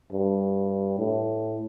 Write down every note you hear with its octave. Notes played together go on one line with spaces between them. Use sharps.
G2
A2